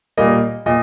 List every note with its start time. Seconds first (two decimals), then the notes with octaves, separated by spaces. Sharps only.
0.18 A#2 G3 A#3 D#5
0.66 A#2 D#5